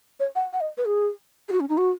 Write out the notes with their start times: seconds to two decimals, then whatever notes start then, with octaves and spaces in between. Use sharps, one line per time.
0.20 C#5
0.36 F#5
0.53 F#5
0.61 D#5
0.77 B4
0.85 G#4
1.49 G#4
1.52 F#4
1.60 C#4
1.69 D#4
1.78 F#4